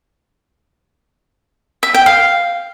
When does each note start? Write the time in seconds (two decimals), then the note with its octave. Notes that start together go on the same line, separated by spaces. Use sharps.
1.83 E5
1.94 G5
2.06 F5